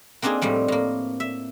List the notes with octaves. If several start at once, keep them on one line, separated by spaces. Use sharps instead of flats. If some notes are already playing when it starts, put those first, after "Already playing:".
A#3 C4 D4 D#4 G#4
A2 F3 G3 C4
A2 A#3
E5